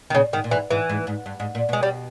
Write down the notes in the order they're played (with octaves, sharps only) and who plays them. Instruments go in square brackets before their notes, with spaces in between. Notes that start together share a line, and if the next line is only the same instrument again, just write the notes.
[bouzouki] D#3
[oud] A#2 [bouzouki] C#3
[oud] G#2 [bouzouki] D#3
[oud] A#2
[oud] G#2 [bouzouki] E3
[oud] G#2 [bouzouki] E3
[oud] G#2
G#2
G2
G#2
A#2
[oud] B2 [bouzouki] G#3
[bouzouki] G3